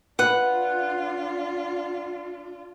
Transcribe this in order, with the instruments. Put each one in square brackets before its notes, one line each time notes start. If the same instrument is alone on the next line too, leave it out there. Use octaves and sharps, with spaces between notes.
[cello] D4 F4 [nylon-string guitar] B4 [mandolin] F#5